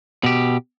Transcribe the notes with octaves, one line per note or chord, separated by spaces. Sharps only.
B2 G4